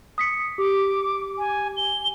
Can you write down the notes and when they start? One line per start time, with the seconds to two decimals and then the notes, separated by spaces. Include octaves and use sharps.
0.18 D#6 B6 C#7
0.58 G4 D6
1.38 G#5
1.77 G7